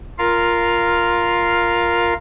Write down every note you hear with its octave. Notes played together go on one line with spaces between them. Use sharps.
F4 A#4 F5